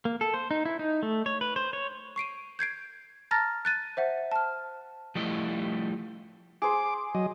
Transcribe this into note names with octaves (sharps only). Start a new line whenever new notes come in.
A#3
A4
C5
D#4
E4
D#4
A3
C#5
B4
C5
C#5
C#6 C7 D7 D#7
G6 G#6 C7 D7
A5 A#5 F6 A6 A#6
F#6 A6 D#7
C5 E5 F#5
A5 F6
F3 G3 A3 E4 D#5
G#4 C5 D6
F#3 D#5